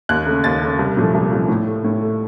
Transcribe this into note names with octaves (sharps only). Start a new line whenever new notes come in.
D#2 F#6
C#3 A3
D#2 A6
C#3 A3
C2
A#2 F3 A3
C2
A#2 F3 A3
A2
A3
A2
A3